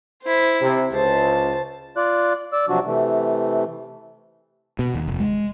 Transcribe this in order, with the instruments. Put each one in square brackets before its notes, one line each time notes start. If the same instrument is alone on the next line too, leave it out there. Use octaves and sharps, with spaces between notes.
[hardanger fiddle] E4 C5
[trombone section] C3
[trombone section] C#2 [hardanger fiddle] C5 A5
[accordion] F4 D5 F#6
D5 E6
C3 F3 F#3 D4 F#4
C3 E3 A3
[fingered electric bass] B2
D#2
F1
G#3